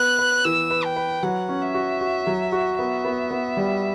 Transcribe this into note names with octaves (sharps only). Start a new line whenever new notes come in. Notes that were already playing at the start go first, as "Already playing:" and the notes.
Already playing: B3 B4 F#6
B4
E3 E6
B4
G5
B4
F#3 F#5
C#4
E5
F#4
F#4
F#3
F#4
B3 E5
B3
B3
G3